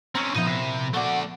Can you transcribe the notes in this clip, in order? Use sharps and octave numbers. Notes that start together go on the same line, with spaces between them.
C4 C#4 A#5 C6 C#6
A#2 F3 B3 D#4 E4 B4 C5 D#5
C3 C7
A3 B3 F#4 D5 F#5